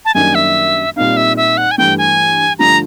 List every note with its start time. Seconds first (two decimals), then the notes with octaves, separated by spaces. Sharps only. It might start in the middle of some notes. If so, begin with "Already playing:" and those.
0.05 A5
0.14 F#2 D#3 G3 A#3 D4 G#5
0.35 E5
0.96 A#2 G3 C4 D#4 F5
1.17 E5
1.37 E5
1.57 F#5
1.71 G#5
1.78 G2 E3 A3 G5
1.98 G#5
2.59 G2 D3 F3 A3 A#5